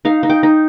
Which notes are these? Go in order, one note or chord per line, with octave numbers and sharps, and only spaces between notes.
D#4 F5
D#4
G5
D#4